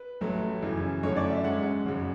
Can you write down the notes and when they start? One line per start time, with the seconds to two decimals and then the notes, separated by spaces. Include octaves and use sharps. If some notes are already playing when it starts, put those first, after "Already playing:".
Already playing: B4
0.21 A1 A2 F#3 A3
0.62 F#2 C#3 E3
1.03 F#2 D3 A3 C#4 C#5
1.16 D5
1.30 E5
1.44 G#2 G#3 C#4 F#5
1.85 G#1 F#2 C#3